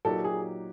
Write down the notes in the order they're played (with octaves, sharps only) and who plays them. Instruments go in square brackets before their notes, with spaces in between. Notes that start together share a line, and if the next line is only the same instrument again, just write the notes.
[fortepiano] A#2 F#3 A#3 D#4 G4 [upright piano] A4
[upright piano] G#4